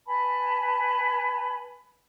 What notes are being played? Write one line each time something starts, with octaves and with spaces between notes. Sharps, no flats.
B4 G#5 A5 B5